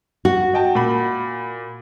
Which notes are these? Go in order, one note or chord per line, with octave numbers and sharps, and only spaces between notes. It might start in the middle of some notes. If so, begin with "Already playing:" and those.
F#4
D#5 G5 A5
A#2 B5